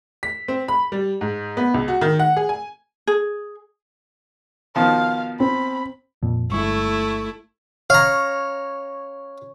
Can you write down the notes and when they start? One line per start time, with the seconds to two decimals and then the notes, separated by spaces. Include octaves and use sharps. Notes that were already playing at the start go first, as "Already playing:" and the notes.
0.23 B6
0.48 C4
0.68 B5
0.92 G3
1.21 G#2
1.57 B3
1.74 C#2
1.88 F#4
2.01 D#3
2.19 F#5
2.37 G#4
2.49 G#5
3.07 G#4
4.76 B2 D#3 F3 F5
5.40 C4 B5
6.23 F2 A#2
6.52 G1 G2 G#3 A3 E4 C#6
7.90 C#5 F5 A#5